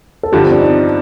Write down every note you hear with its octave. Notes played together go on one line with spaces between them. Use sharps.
A4
G2 D3 F3 G4
C4
D4
D#4